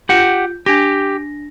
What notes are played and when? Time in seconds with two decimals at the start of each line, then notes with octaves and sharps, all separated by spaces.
0.09 F4 G4 F#5 G6
0.66 D4 G4 A#6